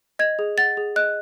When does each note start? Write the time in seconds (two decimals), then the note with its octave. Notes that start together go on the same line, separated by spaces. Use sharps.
0.19 D#5 G#6
0.39 G#4
0.58 F#5 A6
0.77 G#4
0.96 D#5 F#6